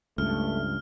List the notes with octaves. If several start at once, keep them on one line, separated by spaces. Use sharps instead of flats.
C#2 G2 A3 F6